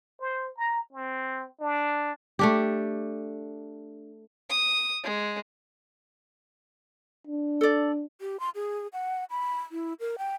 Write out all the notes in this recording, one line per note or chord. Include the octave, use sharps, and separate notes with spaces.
C5
A#5
C4
D4
A3 D4 G4
D#6
G#3
D4
A4 D5
G4
C6
G#4
F#5
B5
E4
A#4
G5